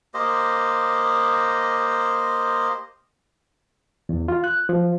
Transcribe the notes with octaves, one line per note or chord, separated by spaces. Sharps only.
A#3 G4 C5 D#5
E2
F4
F#6
F3